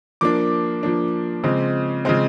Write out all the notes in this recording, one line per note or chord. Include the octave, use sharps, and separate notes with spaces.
F3 A#3 D4 D6
F3 A#3 D4
C#3 F3 G#3 C4
C#3 F3 G#3 C4